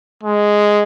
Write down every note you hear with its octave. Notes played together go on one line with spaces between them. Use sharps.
G#3